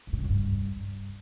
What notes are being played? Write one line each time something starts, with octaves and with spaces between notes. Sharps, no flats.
G2
A2
C#3
E2
G2